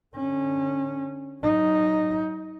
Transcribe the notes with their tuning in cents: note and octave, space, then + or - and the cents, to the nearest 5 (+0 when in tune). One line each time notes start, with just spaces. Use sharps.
D3 +0 C#4 -20
F#3 +35 D#4 +0